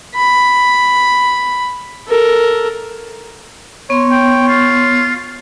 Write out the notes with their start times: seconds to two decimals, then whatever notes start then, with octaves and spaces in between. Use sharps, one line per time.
0.15 B5
2.07 A4 A#4
3.90 B3 C#5 C6
4.11 G5
4.48 F4